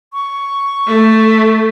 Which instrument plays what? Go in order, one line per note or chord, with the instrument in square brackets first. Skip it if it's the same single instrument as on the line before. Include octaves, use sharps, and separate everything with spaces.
[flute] C#6
[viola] A3